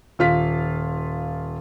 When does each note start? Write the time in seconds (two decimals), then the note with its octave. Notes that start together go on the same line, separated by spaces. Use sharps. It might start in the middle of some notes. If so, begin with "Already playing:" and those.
0.19 D#1 F4 F5 B6